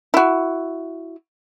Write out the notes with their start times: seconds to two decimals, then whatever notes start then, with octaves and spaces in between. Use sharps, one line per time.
0.14 E4 F#4